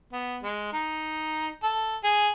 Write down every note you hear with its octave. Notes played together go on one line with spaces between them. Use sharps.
B3
G#3
D#4
A4
G#4